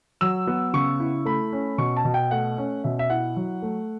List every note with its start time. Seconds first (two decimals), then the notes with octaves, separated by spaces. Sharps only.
0.21 F#3 E6
0.47 B3
0.73 C#3 C#6
1.00 E4
1.25 A3 B5
1.53 C#4
1.78 B2 C#6
1.97 A5
2.05 B2
2.14 G5
2.31 A3 F#5
2.58 C#4
2.84 B2 E5
2.99 E5
3.10 E4 F#5
3.36 F#3
3.62 A3